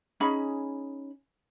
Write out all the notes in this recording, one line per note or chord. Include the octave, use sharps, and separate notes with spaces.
C#4 D#4 G#4 B5